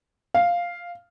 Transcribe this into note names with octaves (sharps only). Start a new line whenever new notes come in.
F5